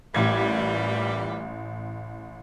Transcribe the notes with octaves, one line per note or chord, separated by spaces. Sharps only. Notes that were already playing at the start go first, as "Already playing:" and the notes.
A1 A#2 E3 G3 G#6